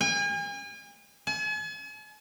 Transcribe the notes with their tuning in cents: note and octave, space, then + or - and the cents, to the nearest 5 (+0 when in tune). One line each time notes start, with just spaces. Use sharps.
G#5 -40
G#5 +45